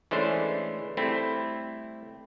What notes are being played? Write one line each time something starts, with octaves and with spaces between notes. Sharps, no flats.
E3 G#3 A3 C#4 D4 C5
G3 A3 C4 E4